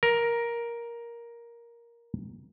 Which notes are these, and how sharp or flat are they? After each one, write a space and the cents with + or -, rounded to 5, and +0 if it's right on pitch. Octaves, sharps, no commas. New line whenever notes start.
A#4 +10